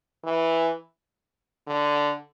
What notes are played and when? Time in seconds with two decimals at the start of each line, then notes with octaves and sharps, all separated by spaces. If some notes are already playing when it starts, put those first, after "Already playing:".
0.25 E3
1.67 D3